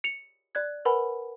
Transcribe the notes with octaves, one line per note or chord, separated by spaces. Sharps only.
C#7 F7
D5 F#6 G#6
A#4 B4 F#5 G#5 B5